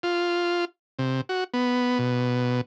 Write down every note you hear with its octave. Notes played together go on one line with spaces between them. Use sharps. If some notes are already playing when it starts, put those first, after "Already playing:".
F4
C3
F#4
B3
B2